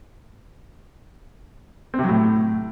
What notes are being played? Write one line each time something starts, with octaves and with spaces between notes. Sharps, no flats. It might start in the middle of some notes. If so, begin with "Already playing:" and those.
C4
C3
F#3
A2